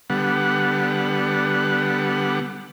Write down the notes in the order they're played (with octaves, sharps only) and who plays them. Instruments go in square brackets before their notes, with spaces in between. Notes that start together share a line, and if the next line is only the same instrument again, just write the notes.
[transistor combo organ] D3 G3 B3 F#5